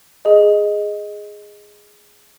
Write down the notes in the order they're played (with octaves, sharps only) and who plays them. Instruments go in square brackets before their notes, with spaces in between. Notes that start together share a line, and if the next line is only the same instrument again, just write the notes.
[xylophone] G#4 D#5